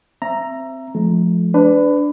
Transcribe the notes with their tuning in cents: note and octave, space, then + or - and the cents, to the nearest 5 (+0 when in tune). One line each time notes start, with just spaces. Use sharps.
C4 +0 E5 +20 A#5 +0
F3 +0 A3 -40
D4 +0 B4 +25